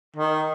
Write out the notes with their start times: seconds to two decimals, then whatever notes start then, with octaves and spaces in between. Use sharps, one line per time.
0.16 D#3